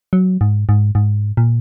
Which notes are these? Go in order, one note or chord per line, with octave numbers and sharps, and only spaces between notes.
F#3
G#2
G#2
G#2
A#2